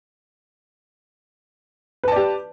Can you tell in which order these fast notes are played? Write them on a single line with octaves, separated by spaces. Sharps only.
B4 A5 D5 G4